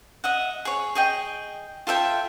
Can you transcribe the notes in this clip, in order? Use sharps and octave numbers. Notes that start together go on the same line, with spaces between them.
D#5 E5 F#5
G#4 C#5
G#4 D#5 G5
F4 A4 E5 G5